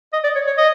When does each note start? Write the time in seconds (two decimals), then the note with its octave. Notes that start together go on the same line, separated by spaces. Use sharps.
0.13 D#5
0.24 D5
0.35 C#5
0.47 C#5
0.57 D#5